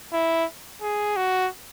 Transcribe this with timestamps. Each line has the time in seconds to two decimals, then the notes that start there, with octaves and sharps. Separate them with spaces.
0.13 E4
0.82 G#4
1.16 F#4